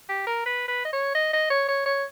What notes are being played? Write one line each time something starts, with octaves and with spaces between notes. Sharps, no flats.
G4
A#4
B4
B4
D#5
C#5
D#5
D#5
C#5
C#5
C#5